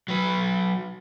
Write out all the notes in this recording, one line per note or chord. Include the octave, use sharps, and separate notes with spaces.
F#3 B4